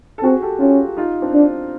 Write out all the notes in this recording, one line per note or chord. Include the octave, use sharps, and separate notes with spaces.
A4
C4 F#4 G#4
G4 A4
C#4 F4 G4
D#4 F4
C4 D4
D4